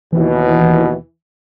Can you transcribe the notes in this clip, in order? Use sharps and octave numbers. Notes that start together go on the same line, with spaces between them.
D#2 B2 E3